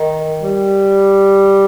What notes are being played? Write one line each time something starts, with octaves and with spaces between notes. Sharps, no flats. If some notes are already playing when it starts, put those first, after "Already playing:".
Already playing: D#3
G3